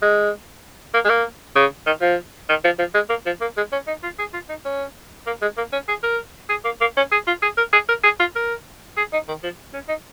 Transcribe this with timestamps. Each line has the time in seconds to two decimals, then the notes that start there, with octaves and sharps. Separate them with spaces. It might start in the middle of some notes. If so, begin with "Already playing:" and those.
0.02 G#3
0.94 A#3
1.05 G#3
1.09 A#3
1.56 C#3
1.86 D#3
2.02 F3
2.49 D#3
2.64 F3
2.79 F3
2.95 G#3
3.10 A#3
3.26 F3
3.41 A#3
3.57 G#3
3.72 C#4
3.87 D#4
4.03 F4
4.19 G#4
4.34 F4
4.49 D#4
4.65 C#4
5.27 A#3
5.42 G#3
5.57 A#3
5.73 C#4
5.89 G#4
6.03 A#4
6.49 G#4
6.65 A#3
6.81 A#3
6.97 C#4
7.12 G#4
7.27 F4
7.43 G#4
7.57 A#4
7.73 G#4
7.89 A#4
8.04 G#4
8.20 F4
8.35 A#4
8.97 G#4
9.13 D#4
9.28 D#3
9.43 F3
9.74 C#4
9.89 D#4